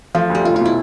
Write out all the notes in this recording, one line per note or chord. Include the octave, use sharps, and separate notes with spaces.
F3 A3
D2 G3
F1 F4
B2 F4
E4